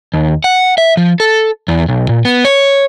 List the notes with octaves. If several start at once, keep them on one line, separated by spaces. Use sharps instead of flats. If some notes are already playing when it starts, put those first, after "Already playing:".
D#2
F#5
E5
F3
A4
E2
B1
A#2
B3
C#5